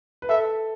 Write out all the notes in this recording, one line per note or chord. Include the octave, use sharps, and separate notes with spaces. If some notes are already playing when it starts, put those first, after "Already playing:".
B4
A4 E5